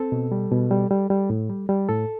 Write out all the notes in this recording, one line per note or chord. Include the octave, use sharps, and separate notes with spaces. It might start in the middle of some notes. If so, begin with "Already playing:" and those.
Already playing: C4 A4
B2
G3
B2
G3
G3
G3
A2
G3
G3
A2 A4